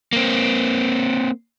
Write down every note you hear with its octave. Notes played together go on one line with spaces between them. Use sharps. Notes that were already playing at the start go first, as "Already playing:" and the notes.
A#3 C4